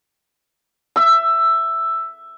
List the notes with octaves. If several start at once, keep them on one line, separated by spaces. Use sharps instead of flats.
E5 E6